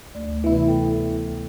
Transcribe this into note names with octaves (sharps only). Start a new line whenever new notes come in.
D2 A3 D5
C3 E3 B3 E4
A4 G5